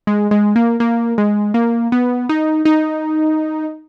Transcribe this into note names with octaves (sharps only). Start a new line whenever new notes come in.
G#3
G#3
A#3
A#3
G#3
A#3
B3
D#4
D#4